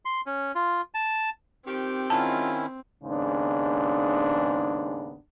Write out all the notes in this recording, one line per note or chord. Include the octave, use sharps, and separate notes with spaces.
C6
C#4
F4
A5
D#3 F3 C4 G4
D#3 F#3 G#3 C#4 E4 F4 A5
D#2 G#2 C#3 B3 D4